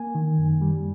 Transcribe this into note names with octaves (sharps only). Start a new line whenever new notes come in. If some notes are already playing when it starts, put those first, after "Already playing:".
Already playing: A#3 G#5
D#3
F#2
G3